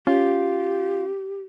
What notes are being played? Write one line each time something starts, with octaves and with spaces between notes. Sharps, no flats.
C#4 F4 G4